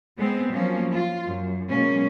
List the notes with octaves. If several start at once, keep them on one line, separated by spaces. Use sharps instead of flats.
G#3 B3 C4 C5
F3 F#3 A#3 C#4
F4
F#2
B2 F#3 G#3 A#3 C#4